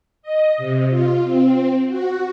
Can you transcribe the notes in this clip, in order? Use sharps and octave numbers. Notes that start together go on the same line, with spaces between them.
D#5
C3
F4
C4
F#4